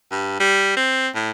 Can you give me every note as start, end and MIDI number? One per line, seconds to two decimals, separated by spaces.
0.11 0.40 43
0.40 0.75 55
0.76 1.08 60
1.15 1.31 45